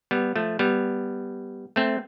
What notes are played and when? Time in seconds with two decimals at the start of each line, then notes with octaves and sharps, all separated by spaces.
0.11 G3 B3
0.36 F3 A3
0.59 G3 B3
1.76 A3 C4